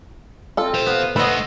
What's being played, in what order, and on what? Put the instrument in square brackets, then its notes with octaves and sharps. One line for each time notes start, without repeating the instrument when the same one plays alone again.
[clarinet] C4 [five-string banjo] F4 A4
[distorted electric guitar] G4 C5
[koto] B3 [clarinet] F5
[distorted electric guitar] A3 F#5 [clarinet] A4 [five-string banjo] B4 [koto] C5 D#5